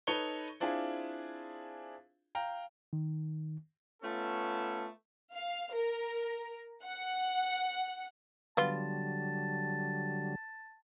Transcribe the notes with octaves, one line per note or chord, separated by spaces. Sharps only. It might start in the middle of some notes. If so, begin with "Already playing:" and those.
D#4 A4 B4 C#5 C#7 G7
C4 D4 E4 F4 G#4
F5 G5 A#5
D#3
A3 B3 C#4 F4 A4
F5
A#4
F#5
D3 F#3 G3 B3 F4 A5